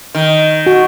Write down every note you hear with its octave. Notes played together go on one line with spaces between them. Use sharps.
D#3
F#4